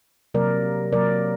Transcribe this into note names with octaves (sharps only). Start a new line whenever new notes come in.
C3 F#3 A#3 A#4 D5
C3 F#3 A#3 A#4 D5